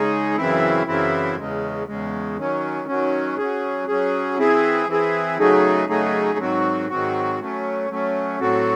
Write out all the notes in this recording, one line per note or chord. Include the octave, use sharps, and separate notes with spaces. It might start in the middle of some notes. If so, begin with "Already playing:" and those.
Already playing: C#3 G#3 D#4 G#4
F#2 C#3 E3 C4 E4
F#2 C#3 E3 C4 E4
E2 C#3 G#3
E2 C#3 G#3
D#3 F#3 C#4
D#3 F#3 C#4
F#3 C#4 G#4
F#3 C#4 G#4
E3 C4 E4 G#4
E3 C4 E4 G#4
C#3 F#3 A3 D#4 G#4
C#3 F#3 A3 D#4 G#4
G#2 D#3 F#3 C4 F#4
G#2 D#3 F#3 C4 F#4
F#3 A3 C#4
F#3 A3 C#4
A2 F#3 C4 F#4 A4